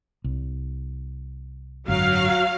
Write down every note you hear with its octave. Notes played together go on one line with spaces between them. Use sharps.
C2
G#1 F#2 D3 F#3 F#4 F5